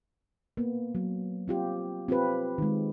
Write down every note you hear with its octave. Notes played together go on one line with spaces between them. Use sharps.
A#3 B3
F#3
C4 F4 G4
C4 F4 G4 B4
D#3 G#3